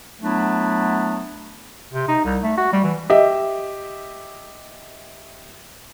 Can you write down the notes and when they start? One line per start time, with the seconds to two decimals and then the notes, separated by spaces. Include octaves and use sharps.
0.22 F#3 A3 B3 D4 E4
1.94 C3
2.08 D#4
2.25 C2
2.42 A3
2.57 F#4
2.73 G3
2.84 E3
3.10 G4 D#5 E5